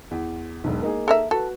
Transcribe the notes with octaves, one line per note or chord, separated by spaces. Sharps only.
E2
E1 B1
A#3 D#4 G#4
A4 A#4 E5
F#4 A4 B4